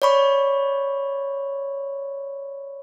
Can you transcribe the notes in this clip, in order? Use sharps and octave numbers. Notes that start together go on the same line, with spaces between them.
C#5 D5 B5 C#6